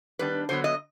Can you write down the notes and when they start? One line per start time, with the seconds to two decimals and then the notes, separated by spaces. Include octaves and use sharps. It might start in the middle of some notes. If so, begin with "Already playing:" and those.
0.19 D#3 G3 B3 D4 B4
0.49 D3 F#3 B3 C5
0.64 D#5